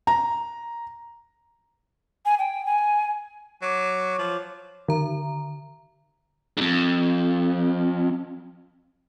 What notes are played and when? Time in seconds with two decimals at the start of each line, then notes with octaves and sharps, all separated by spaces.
0.07 A#5
2.26 G#5
2.39 G5
2.66 G#5
3.62 F#3 C#5 D6
4.19 F3
4.88 D3 D#3 A#5
6.57 F2 G#2